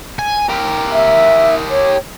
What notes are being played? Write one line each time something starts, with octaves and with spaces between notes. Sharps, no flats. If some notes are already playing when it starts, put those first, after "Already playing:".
G#5
G4 A#4
E5
C#5